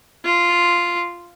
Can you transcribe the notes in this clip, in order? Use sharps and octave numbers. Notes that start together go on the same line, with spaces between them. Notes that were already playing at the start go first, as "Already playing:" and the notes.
F4